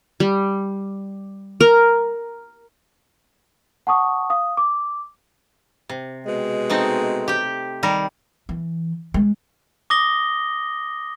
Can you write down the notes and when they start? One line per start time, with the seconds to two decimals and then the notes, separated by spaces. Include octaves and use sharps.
0.20 G3
1.61 A#4
3.87 F#5 A5 C#6 D#6
4.30 F5 D#6
4.57 D6
5.89 C3
6.26 B2 G#3
6.70 A3 C4 D#4
7.28 G4 G5
7.83 D#3 G3 A#4
8.49 E3
9.14 G#3
9.90 D6 D#6 A#6 G7